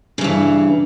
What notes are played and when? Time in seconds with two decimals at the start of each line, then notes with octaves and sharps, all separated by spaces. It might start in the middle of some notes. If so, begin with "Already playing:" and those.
0.18 C#3
0.21 G2
0.24 E3